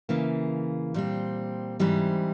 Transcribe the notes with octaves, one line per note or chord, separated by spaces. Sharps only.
C#3 E3 A#3
A#2 G3 C4
G#2 E3 G3 C4